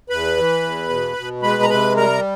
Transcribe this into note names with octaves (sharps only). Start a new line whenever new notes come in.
E2 B4 B5
E3
E2
B2
B2
G#3 B4 B5
A#5
C3 B4 B5
G3 A#4 A#5